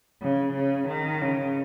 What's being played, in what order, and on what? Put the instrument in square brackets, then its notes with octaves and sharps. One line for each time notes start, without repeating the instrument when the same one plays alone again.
[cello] C#3
C#3
D#3
C#3